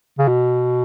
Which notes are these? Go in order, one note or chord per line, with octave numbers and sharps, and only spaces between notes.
C#3
B2